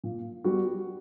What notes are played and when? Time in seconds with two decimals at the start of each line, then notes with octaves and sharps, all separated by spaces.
0.04 A#2
0.44 G3 B3 F#4